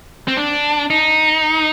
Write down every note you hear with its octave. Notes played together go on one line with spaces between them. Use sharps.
C4
D4
D#4